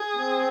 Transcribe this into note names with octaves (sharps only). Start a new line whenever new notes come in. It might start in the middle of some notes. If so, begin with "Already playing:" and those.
Already playing: G#4
C4